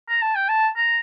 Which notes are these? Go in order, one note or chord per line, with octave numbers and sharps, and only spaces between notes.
A#5
A5
G5
A5
A#5